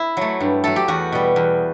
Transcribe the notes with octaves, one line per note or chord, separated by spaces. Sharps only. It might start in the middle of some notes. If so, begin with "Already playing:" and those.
Already playing: E4
F#3 A3
G2
F#3 A3 A4
G4
E2 F#4
B2 G3
E2